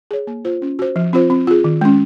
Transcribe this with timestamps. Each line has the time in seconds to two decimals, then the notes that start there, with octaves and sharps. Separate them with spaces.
0.11 G#4 C#5
0.27 A#3
0.45 F4 C5
0.62 C#4
0.79 F#4 C5
0.96 F3
1.13 C4 F4 C5
1.30 C4
1.47 F4 G#4
1.64 D#3
1.81 G#3 C#4